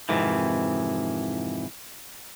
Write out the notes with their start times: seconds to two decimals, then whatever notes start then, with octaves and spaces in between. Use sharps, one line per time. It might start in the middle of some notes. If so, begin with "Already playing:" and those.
0.09 F2 G#2 C3 D#3 E3